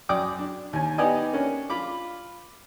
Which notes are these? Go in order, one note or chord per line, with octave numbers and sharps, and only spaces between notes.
F#2 D5 G5 D6 D#6
D4
D#2 G#5
B3 D#4 G4 D5 D#5 G#5
A#3 C#4 D4
F4 B5 D6